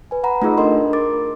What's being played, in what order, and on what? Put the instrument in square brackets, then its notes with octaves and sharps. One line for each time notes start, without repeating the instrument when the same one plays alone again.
[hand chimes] B4 G#5
F#5 A#5 B5
A3 D#4 F4 G#4 E6
D4 A4 A#4 D#5 C6
A#4 D6 A6